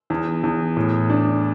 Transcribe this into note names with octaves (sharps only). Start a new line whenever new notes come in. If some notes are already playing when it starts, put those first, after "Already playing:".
E2
E2
A2
D4